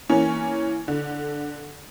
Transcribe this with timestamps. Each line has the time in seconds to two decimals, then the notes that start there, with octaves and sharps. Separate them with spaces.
0.10 E3 A#3 C#4
0.88 D3